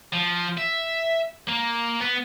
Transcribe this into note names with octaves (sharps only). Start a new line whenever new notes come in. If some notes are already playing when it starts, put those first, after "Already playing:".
F3
E5
A#3
B3